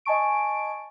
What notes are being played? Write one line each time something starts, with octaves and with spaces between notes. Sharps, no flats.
D#5 G#5 A5 C#6 D7